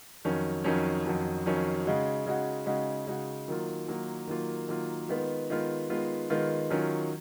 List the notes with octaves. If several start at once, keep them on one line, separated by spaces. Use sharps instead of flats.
F2 D#3 F#3 C#4
F2 D#3 F#3 C#4
F2 D#3 F#3 C#4
F2 D#3 F#3 C#4
C#3 G#3 D#4 F#4
C#3 G#3 D#4 F#4
C#3 G#3 D#4 F#4
C#3 G#3 D#4 F#4
D#3 F#3 A#3 F4
D#3 F#3 A#3 F4
D#3 F#3 A#3 F4
D#3 F#3 A#3 F4
D#3 G#3 B3 F4
D#3 G#3 B3 F4
D#3 G#3 B3 F4
D#3 G#3 B3 F4
D#3 F#3 C#4 F4